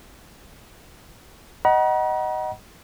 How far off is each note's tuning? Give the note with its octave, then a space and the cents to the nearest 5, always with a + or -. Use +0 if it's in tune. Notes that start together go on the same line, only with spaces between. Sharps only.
D#5 +0 F#5 +25 A#5 +45